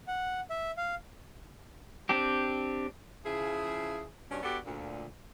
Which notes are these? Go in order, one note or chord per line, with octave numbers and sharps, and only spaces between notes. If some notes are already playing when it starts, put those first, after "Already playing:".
F#5
E5
F5
C4 D4 G4
C#3 F3 E4 G#4
G2 B2 C#4 D4
B3 D4 F#4 G4 A4 D5
D2 A#2